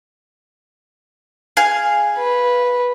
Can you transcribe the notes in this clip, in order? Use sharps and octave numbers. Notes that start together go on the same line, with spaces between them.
G#4 F5
B4